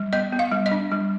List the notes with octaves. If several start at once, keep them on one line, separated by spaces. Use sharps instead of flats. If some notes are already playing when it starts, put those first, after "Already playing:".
Already playing: G3
B3 D#5
B3
F5
G3
D#5
D4
G3